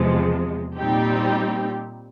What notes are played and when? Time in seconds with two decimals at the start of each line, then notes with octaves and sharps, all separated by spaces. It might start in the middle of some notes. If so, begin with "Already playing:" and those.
Already playing: E2 C3 F3 G#3
0.76 A#2 G3 C4 D#4 G4